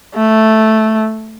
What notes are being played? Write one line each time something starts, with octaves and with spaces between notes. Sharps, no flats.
A3